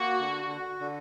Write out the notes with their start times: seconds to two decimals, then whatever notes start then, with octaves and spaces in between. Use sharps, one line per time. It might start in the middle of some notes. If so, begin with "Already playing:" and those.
Already playing: A#3 F#4
0.19 D3
0.50 F#4
0.80 D3